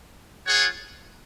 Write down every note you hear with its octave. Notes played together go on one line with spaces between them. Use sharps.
F4 G#4 C#5 F#5